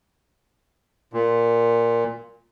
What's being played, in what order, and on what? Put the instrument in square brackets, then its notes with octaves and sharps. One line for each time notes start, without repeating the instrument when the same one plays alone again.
[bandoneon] A#2